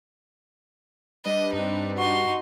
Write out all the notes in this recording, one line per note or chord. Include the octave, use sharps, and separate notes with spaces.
G3 D4 B4 D#5
G2 C4 D#4
D#4 F#4 C6